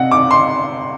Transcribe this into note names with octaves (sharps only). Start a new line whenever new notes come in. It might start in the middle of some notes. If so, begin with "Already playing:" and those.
Already playing: C3 D#5 F#5
D6
C6